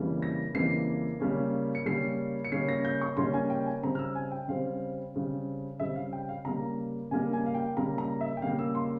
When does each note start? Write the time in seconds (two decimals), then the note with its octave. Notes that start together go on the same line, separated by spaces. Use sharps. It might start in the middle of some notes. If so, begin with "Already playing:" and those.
Already playing: F2 C#3 E3 G3 A#3
0.22 A#6
0.54 F2 C#3 E3 G3 A#3 C7
1.20 C#3 G3 A#3 C#4
1.75 C#7
1.85 C#3 G3 A#3 C#4 C7
2.45 C#7
2.52 C#3 G3 A#3 C#4 C7
2.69 A#6
2.85 G6
3.01 C#6
3.17 C#3 G3 A#3 C#4 C6
3.34 G#5
3.50 G5
3.66 G#5
3.82 C#3 G3 C4 A#5
3.95 F6
3.99 E6
4.15 G#5
4.32 G5
4.48 C#3 G3 C4 F5
5.14 C#3 G3 C4
5.80 C#3 G3 C4 E5
5.96 F5
6.13 G5
6.29 F5
6.45 C#3 G3 A#3 A#5
7.11 C#3 G3 A#3 G#5
7.33 G#5
7.46 F5
7.55 G5
7.77 C#3 G3 A#3 A#5
7.98 A#5
8.21 E5
8.37 G5
8.42 C#3 G3 A#3 F5
8.59 E6
8.75 C6